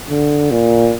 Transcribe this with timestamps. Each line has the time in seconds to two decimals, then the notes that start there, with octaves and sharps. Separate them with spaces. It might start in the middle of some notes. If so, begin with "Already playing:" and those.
0.10 D3
0.51 A#2